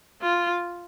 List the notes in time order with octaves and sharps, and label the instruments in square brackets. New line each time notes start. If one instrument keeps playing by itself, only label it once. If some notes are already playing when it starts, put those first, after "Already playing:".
[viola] F4